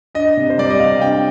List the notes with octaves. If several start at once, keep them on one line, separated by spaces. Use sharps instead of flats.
D4 D#5
C3
C5
G3 D5
D#5
C3 F5
D4 G5